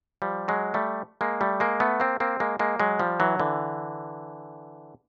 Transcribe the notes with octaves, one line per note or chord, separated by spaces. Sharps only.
F3 G3
F#3 G#3
G3 A3
G#3 A#3
G3 A3
G#3 A#3
A3 B3
A#3 C4
A#3 C4
G#3 A#3
G#3 A#3
F#3 G#3
F3 G3
E3 F#3
D3 E3